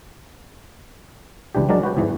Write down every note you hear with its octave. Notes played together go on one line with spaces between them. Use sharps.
C#2 E3 D4 G4
F#3 G#3 D4 A#4 D5
F#4 B4 G5
E2 G#2 E3